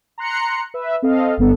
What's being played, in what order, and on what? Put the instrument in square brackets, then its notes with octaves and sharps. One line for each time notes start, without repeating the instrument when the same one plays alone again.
[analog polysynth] A#5 C6 F#6 C#7
B4 E5
C4 A4 D#5 F5
G1 G2 B3 A4